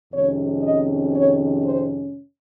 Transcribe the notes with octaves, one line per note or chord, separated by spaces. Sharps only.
F2 C3 D#3 G#3 C#4 C#5
D#5
C#5
C5